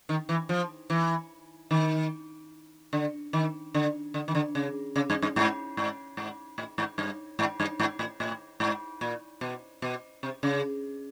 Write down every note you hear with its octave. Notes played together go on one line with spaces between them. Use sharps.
D#3
E3
F3
E3
D#3
D3
D#3
D3
D3
D#3
D3
C#3
C#3
G2
G2
G#2
G#2
G#2
A2
G#2
G2
G#2
G2
G#2
A2
A2
G#2
A#2
B2
B2
C3
C#3